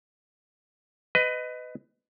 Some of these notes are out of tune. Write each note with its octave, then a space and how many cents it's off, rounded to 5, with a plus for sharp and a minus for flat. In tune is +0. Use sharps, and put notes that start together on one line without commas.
B4 +25 D#5 +0